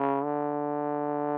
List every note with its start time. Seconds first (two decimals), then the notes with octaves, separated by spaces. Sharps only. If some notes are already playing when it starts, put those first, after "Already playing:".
Already playing: C#3
0.24 D3